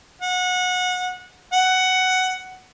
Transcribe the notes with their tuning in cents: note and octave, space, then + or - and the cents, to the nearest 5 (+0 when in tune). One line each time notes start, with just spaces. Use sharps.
F#5 -25
F#5 +10